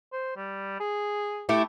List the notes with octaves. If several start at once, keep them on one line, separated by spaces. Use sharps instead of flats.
C5
G3
G#4
A3 E4 G4